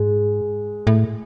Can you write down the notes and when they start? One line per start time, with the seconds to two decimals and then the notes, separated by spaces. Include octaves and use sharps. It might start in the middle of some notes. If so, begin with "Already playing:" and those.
Already playing: G#2 G#3
0.87 A2